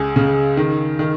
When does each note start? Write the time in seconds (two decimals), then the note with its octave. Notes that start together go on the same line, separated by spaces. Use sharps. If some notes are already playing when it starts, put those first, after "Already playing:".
Already playing: C#2 G#4
0.16 C#3
0.57 D#3
0.99 D#3